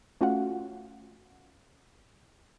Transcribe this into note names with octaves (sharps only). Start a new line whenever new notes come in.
A3 C#4 F4 F#4 F5 F#5